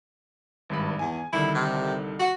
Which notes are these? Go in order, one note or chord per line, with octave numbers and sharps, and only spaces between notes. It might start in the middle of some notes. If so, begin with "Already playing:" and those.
G#1 G2 B5
E2 G#5
C2 D3 D#3 E4
C3
F#4